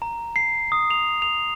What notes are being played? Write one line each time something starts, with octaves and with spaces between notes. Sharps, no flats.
A#5
C7
D#6
F7
F7